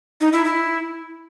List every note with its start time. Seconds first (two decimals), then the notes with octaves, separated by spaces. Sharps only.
0.21 D#4
0.33 E4
0.45 E4